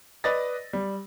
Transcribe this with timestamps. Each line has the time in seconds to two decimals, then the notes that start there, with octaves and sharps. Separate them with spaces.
0.24 B4 D5 D#5 A6 A#6
0.73 G3